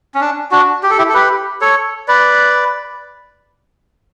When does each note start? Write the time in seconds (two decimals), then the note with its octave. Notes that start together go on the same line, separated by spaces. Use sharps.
0.15 C#4
0.21 D4
0.51 D4 F#4
0.83 G4
0.90 A4
0.98 E4 G4
1.09 A4
1.14 G4 B4
1.61 A4 C#5
2.08 B4 D5